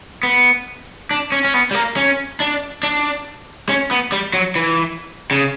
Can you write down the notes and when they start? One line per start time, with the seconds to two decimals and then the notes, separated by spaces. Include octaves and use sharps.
0.23 B3
1.11 D4
1.32 C#4
1.45 C#4
1.54 B3
1.71 G3
1.75 A#3
1.96 C#4
2.40 D4
2.83 D4
3.69 C#4
3.91 B3
4.12 G3
4.33 F#3
4.56 E3
5.31 C#3